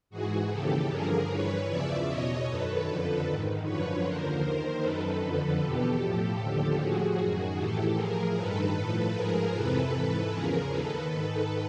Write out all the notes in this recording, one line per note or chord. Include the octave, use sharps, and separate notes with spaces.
G#2 E3 F#4 G#4
D#2 C#3 E3 G4 A4
G2 D3 F3 G#4 A#4
G2 E3 B4 C#5
E2 C#3 F3 D5 E5
E2 B2 C#5 D#5
F#2 D#3 A4 B4
F2 D3 F3
G#2 D#3
F#2 D3 F3 B4 C#5
D#2 D3 F3 A#4 C5
D#2 D#3 A#4 C5
F#2 D#3 A4 B4
F2 D3 F3
E2 B2 G4 A4
A2 F3 G4 A4
D#2 D3 F3
A2 F3 F#4 G#4
F#2 D#3
A2 E3 G4 A4
A2 F3 G#4 A#4
G2 D#3 A4 B4
A2 F3
G#2 F3 G#4 A#4
F2 C3 E3 A4 B4
G#2 E3 A4 B4
E2 C#3 F3 G#4 A#4
D#2 D#3 A4 B4
G#2 D#3